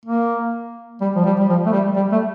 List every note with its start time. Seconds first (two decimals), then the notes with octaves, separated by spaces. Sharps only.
0.06 A#3
1.01 G3
1.16 F3
1.25 G3
1.39 G3
1.48 F3
1.66 A3
1.72 G3
1.96 G3
2.12 A3